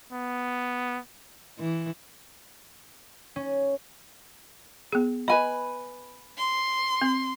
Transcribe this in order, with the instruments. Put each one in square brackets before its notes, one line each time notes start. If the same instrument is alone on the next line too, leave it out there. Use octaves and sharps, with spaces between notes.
[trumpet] B3
[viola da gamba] E3
[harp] C#4
[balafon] B3 G#4
[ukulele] B4 G#5 B5 [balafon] D#5
[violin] C6
[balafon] C4